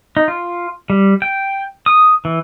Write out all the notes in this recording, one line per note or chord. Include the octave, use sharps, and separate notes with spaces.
D#4
F4
G3
G5
D#6
E3